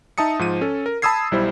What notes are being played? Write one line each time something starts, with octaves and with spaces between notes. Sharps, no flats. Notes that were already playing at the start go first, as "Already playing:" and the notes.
D#4 E5 A5 D#6 C#7
G#2 F3 D#7
C#4 A4
A#4
A5 B5 D#6 E6 G#6 C7
B1 G3 E4 C5